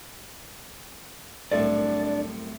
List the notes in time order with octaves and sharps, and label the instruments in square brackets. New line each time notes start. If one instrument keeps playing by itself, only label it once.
[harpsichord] C2 F#2 A2 [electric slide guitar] D4 D5